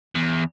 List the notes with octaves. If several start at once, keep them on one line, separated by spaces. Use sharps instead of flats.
E2